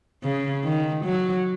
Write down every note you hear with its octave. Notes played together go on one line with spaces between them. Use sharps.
C#3
D#3
F#3